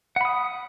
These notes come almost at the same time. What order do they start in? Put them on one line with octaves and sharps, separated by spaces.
F#5 B5 D#6